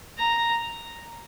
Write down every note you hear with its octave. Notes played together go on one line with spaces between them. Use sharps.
A#5